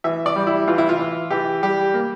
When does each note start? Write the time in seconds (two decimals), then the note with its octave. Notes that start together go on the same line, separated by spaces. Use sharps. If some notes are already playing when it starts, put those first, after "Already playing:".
0.04 E3 E5
0.26 D5
0.36 G3
0.47 E4
0.68 E3 F4
0.78 E4
0.89 F4
0.99 E3
1.30 E3 G4
1.62 G3 G4
1.94 A#3